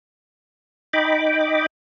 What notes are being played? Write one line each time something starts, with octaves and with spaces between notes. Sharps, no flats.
D#4 D#5 G5 B5 D6